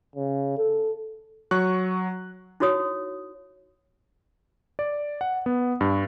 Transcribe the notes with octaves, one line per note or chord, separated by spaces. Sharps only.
C#3
A4
F#3 C#6 F#6
D#4 E4 F#4 C#5 D#6
D5
F#5
B3
G2